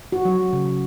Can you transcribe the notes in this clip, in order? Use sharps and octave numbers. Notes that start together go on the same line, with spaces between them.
F#4
F#3
C#3